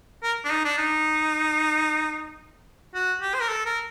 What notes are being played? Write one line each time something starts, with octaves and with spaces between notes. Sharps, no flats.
A#4
D4
D#4
D4
D#4
F#4
G4
C5
A#4
A4
A#4